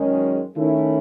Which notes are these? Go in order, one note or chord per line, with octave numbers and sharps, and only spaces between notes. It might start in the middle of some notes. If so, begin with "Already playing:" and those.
Already playing: F#2 D#3 G#3 C#4
D#3 A3 C#4 E4